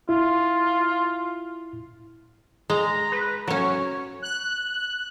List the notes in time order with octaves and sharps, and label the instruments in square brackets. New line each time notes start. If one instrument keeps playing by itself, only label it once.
[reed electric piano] E4 [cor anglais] F4
[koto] G#3 [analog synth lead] A#5
[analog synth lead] B4
[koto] F#3 C#4 [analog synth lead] C#5
[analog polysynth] F#6